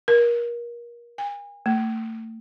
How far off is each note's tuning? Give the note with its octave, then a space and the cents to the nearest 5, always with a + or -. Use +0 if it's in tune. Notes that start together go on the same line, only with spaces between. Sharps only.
A#4 +30
G#5 -40
A3 +35